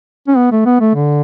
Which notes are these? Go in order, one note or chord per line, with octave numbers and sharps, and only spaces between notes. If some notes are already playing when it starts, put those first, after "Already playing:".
C#4
B3
A3
B3
A3
D3